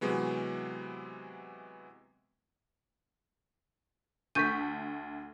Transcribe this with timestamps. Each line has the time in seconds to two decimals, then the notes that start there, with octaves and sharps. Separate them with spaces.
0.01 C3 E3 F#3 G#3 B3
4.35 D2 A3 C#6 G6 B6 D#7